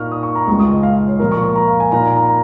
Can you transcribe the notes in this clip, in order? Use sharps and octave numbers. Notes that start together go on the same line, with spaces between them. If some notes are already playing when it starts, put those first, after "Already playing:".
Already playing: A#2 A#3 D#4 C#6 F6
D#6
C#6
A#5
C#2 C#3 G#3 F4 C#6
D#6
D#5
F5
F5
C#5
A#2 F3 A#3 A#4
C#6
C#6
A#5
F5
G#5
A#2 A#3 D#4 A#5
A#5
A#5